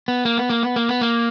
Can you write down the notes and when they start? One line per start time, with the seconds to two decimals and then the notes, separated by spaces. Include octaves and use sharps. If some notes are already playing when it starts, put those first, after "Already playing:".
0.08 B3
0.25 A#3
0.38 B3
0.50 A#3
0.63 B3
0.76 A#3
0.89 B3
1.01 A#3